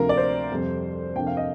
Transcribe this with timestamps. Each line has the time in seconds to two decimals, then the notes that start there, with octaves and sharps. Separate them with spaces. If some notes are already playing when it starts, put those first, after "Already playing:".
Already playing: D2 C3 F3 A#3 A#4
0.09 D5
0.17 C5
0.50 F2 C3 G3 C4
1.15 F2 C3 F3 A#3 D4 G5
1.27 F5
1.37 D#5